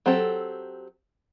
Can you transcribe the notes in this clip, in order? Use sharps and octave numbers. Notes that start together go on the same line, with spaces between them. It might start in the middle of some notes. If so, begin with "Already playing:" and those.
F#3 C4 G4 A4